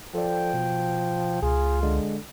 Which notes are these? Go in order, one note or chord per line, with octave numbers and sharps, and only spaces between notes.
F3 A4 D5 G5
B2
C#2 F4 G#4
D3 G#3